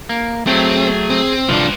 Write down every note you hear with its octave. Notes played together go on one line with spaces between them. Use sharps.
A#3
F#3 A3 C4 G#4 G5
C4
C2 F3 D4 F4 B4